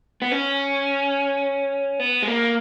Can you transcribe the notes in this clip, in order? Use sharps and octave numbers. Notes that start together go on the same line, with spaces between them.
B3
C#4
B3
G#3
A#3